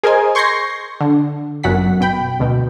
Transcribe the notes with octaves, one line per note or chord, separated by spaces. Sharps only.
G#4 A#4 C5 D#5 G#5
C6 C#6 G6 G#6 A#6 C7
D3
G1 F#2 F#5 B6
B2 G5 B5
D2 B2